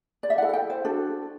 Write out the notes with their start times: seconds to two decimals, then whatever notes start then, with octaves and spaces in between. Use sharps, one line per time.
0.23 D5
0.30 E5
0.38 E4 A4 F#5
0.49 F#5
0.53 G5
0.70 C5
0.85 D4 F#4 A4